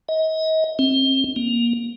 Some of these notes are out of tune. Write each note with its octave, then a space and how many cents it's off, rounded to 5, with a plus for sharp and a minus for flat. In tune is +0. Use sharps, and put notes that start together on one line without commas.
D#5 +35
C4 +30
A#3 +20